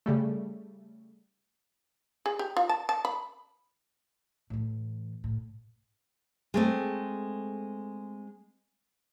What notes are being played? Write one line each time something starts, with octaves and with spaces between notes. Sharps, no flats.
C#3 G3 A3
G#4
G4
F4
A5
A5
B5
A2 E3
A2
G#3 A3 C4